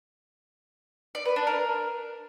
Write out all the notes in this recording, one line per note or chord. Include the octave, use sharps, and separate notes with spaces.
D5
B4
D4
A#4